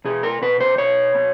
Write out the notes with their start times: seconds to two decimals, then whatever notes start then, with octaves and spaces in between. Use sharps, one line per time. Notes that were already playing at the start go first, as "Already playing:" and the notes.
0.05 B2 G#4
0.23 A#4
0.42 B2 B4
0.60 C5
0.78 B2 C#5
1.15 B2